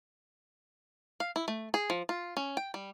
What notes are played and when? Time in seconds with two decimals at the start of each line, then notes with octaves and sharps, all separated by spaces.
1.20 F5
1.36 E4
1.48 A3
1.74 G#4
1.90 F3
2.09 F4
2.37 C#4
2.57 G5
2.74 G3